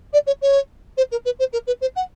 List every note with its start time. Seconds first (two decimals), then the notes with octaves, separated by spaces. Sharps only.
0.13 D5
0.26 C#5
0.41 C#5
0.97 C5
1.11 A#4
1.25 B4
1.39 C5
1.52 A#4
1.67 B4
1.81 C5
1.95 F#5